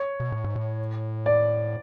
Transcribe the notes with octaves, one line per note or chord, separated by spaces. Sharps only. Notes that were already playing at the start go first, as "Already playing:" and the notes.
Already playing: C#5
B2
A2
G#2
A2
D5